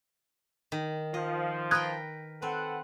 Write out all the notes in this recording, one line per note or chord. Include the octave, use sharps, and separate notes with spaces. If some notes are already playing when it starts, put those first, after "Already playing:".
D#3
F3 D#5
A#4 B4 G5 D#6 F#6 G#6
C4 A4 B4 F#5